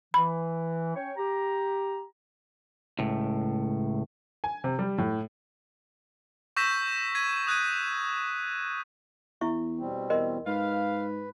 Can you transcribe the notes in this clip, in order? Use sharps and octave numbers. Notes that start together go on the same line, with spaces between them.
E3 B5
C#4 C#5 G5
G4 A#5
C#2 A2
G#5
C3
G3
A2
C#6 E6 G6 A#6 B6 E7
G#6 B6 D#7
D#6 F#6 G#6 D#7
E2 E4 E5 C#6
B2 G3 C4
E2 A#4 D#5 C6
G#2 B4 F5